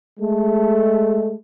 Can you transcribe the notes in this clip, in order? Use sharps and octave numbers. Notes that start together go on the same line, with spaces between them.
G#3 A3